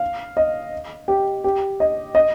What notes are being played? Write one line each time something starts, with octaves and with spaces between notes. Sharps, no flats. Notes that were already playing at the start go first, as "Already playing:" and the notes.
Already playing: F5
D#5
G4
G4
D#5
D#5